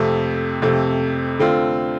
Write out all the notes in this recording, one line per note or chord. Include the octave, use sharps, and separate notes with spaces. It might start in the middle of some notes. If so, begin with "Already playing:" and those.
Already playing: F2 C3 A3
F2 C3 A3
D3 A3 C4 F4